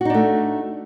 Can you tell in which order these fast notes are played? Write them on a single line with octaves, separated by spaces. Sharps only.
F#4 D#4 D4 A3